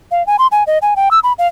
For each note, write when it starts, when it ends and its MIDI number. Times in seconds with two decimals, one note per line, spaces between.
0.11 0.25 77
0.27 0.36 80
0.39 0.47 84
0.52 0.64 80
0.67 0.78 75
0.82 0.94 80
0.96 1.09 79
1.11 1.20 88
1.24 1.33 83
1.38 1.47 77